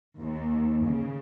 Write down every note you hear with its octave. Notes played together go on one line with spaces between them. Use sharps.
D#2
C#3